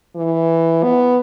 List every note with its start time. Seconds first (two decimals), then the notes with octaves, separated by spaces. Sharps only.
0.16 E3
0.83 B3